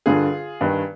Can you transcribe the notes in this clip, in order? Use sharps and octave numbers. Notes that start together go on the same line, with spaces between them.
G2 D3 F4 G#4
G2 D#3